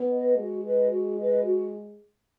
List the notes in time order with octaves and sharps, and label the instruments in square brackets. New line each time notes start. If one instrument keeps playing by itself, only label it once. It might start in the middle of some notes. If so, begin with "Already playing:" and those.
Already playing: [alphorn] B3
[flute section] B4 D#5
[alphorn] G#3 [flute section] F#4
[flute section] B4 D#5
F#4
B4 D#5
F#4